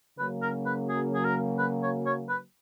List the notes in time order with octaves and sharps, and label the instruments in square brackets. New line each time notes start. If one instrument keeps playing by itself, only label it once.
[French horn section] C#3 F#3 A#3 [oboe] B4
[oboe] A#4
B4
G#4
G#4
A#4
B4
C#5
C#5
B4